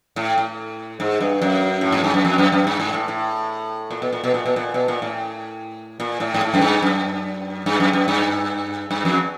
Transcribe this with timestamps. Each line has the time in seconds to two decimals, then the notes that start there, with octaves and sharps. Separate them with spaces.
0.16 A2
0.38 A2
1.00 G#2
1.20 G2
1.42 F#2
1.81 A2
1.92 G#2
2.04 G2
2.14 F#2
2.25 F2
2.38 F#2
2.52 F#2
2.67 G2
2.80 G#2
2.94 A2
3.08 A2
3.91 A#2
4.02 B2
4.13 A#2
4.24 B2
4.34 A#2
4.46 B2
4.56 A#2
4.74 B2
4.88 A#2
5.02 A2
6.00 A#2
6.20 A2
6.34 G#2
6.41 A2
6.54 F#2
6.61 G2
6.82 F#2
7.66 G2
7.80 F#2
7.93 F#2
8.08 G2
8.91 G2
9.05 F2